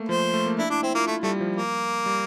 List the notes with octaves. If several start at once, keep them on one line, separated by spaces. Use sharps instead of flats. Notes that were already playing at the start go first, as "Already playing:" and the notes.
Already playing: A3 A#3
F3 C5
A3
A#3
D4 E4
D4 E4
C4 E4
A#3 F4
A3 E4
G3 A3
F3
A#3
G3